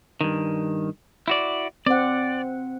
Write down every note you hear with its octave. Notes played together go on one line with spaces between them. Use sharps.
G2 D#3
E4 F#4 D5
C4 D5 F#5